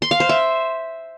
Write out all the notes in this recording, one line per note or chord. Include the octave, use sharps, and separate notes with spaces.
C6
F5
C5
E5